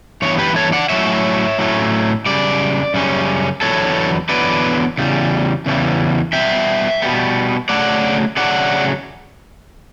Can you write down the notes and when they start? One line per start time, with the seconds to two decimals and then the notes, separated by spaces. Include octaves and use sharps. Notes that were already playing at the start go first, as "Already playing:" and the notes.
0.22 G2 E3 B3 C#5
0.39 G4 B4
0.56 A4 C#5
0.73 D5 F#5
0.89 A2 F#3 A3 C#4 C#5 E5
1.58 A2 F#3 A3 C#4
2.26 F#2 C#3 G3 D5
2.94 F#2 C#3 G3 C#4
3.62 E2 D3 F#3 B3 A4 C#5
4.29 E2 D3 F#3 B3 B4 D5
4.98 E2 C#3 G3
5.66 E2 C#3 E3 G3
6.33 B2 G3 B3 E5 G5
7.02 B2 G3 B3
7.69 C#3 F#3 A3 D5 F#5
8.37 C#3 F#3 A3 D5 F#5